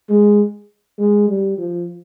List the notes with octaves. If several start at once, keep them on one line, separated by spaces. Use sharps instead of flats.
G#3
G#3
G3
F3